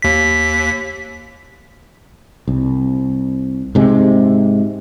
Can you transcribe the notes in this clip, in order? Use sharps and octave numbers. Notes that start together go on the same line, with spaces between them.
D#2 B6
C2
G#2 C3 G#3